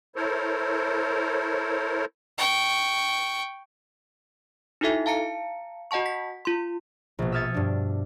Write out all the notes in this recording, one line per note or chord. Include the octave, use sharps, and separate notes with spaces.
E4 A4 A#4 C5 C#5
G5 C#6
D#4 E4 F#4 A4 E5
F5 A5 A#5 C#7
F#4 D#5 F#5 A5 C#6
B6
F4 C6
A#1 B2
E5 D#6 F6 G#6 A6 C#7
G2 D4